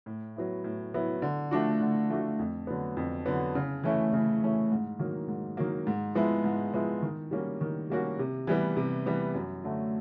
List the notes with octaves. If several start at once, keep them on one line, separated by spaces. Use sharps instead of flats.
A2
F#3 B3 E4
A2
F#3 B3 E4
D3
F3 A3 D4 F#4
D3
F3 A3 D4 F#4
F2
D3 F#3 B3
F2
D3 F#3 B3
C#3
E3 A3 C#4 E4
C#3
E3 A3 C#4 E4
G#2
D#3 F#3 A#3
G#2
D#3 F#3 A#3
G#2
F3 G#3 B3 E4
G#2
F3 G#3 B3 E4
D#3
G3 A#3 C#4 F#4
D#3
G3 A#3 C#4 F#4
C3
E3 G3 B3
C3
E3 G3 B3
F#2
D3 F#3 A3